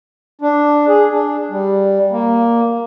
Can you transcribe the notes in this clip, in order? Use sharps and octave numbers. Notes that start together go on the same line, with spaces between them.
D4
G#4
D4
G3
A#3